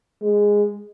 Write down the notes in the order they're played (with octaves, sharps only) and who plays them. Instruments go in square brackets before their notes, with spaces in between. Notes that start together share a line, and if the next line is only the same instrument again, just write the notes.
[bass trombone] G#3